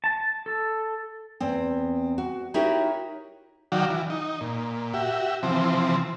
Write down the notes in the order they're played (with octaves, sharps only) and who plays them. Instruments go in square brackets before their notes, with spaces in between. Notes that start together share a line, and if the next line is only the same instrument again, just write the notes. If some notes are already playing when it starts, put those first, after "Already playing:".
[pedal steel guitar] A5
A4
[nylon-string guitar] E2 C4
F#4
D#4 E4 F#4 G4 A#4 C#5
[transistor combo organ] D#3 F#3 F#4 D5 F5 G5
E3
D#4
A#2
F#4 G4 E5
C3 E3 F3 C4